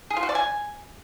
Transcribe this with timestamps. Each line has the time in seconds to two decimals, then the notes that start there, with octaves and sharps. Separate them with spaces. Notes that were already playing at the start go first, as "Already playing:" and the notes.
0.10 G#4
0.17 F4
0.23 F#4
0.29 D5
0.35 G#5